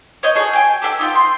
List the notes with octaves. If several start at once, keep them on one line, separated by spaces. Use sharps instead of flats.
C#5 D#5 G6
F#4 G#4 A4
G5 G#5
G4 A4 E5 E6
D#4 F4 G5
C6